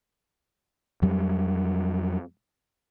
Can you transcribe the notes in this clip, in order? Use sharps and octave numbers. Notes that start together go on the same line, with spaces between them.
F2 F#3 G3